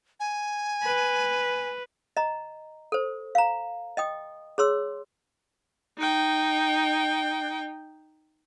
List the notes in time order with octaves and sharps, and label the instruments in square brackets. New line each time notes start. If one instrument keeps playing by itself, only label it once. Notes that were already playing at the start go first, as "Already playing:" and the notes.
[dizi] G#5
[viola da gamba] B4
[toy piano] D#5 A#5
A4 C5
F5 A#5
D#5 G5 D#6
G#4 C#5 C6 E6
[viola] D#4 G5